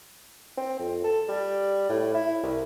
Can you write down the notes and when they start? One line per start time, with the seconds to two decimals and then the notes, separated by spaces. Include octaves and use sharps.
0.58 C4
0.79 F2
1.04 A4
1.28 G3
1.89 A2
2.14 E4
2.43 C2